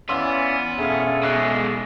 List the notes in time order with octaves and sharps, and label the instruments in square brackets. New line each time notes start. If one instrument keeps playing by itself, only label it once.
[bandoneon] E3 C#4 D5 [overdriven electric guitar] B3 [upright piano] F5 C6 E6
[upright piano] E1 C#4 F5 [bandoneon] G#4 A4 E5
[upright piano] B1 F#6 [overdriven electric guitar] B2 G#3